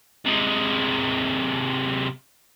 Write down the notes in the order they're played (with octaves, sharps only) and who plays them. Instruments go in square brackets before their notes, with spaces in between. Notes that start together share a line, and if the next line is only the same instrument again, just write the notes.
[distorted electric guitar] C3 G#3